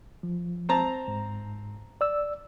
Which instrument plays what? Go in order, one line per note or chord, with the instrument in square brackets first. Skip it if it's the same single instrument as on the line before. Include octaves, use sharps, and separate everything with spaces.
[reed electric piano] F3
[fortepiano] C4 A5 A#5
[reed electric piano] G#2
D5 E6